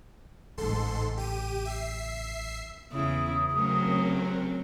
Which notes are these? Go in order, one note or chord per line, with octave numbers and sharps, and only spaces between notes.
A1 G#2 C#3 A4 C6
G4 D#7
E5 C7
E2 C#3 E4 D#6
C#3 F#3 A3 C4 C#4 A#4